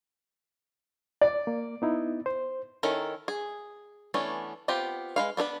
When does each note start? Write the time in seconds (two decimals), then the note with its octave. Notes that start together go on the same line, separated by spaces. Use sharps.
1.21 D5
1.47 A#3
1.82 B3 D#4 E4
2.26 C5
2.83 D#3 C#4 E4 A4 A#4
3.28 G#4
4.14 E3 A3 B3 C#4 D4
4.68 B3 C4 F4 G4
5.16 G#3 B4 F5
5.37 B3 D4 A#4 B4